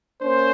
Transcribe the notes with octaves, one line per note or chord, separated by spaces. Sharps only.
A#3 C#4 C5